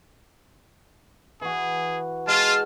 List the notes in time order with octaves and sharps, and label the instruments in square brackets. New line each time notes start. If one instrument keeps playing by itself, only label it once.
[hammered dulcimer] E3 F#4 [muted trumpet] G#4
[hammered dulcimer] G#3 [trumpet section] F4 [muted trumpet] A5 [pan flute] F6